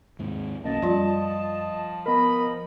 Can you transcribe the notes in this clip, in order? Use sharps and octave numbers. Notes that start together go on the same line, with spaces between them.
D#2 G#2 C3
B1 D#3 F#3 A#3 C#4 D#5 A5
F#2 F3 G3 F4 D5
B3 A#4 D#5 B5